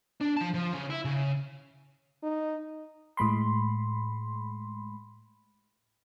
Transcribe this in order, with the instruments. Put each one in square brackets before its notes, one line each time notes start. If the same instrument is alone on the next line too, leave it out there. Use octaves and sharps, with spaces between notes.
[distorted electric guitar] D4
F3 A5
F3
C#3
E4
C#3
[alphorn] D#4
[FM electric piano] A2 G#3 B5 C6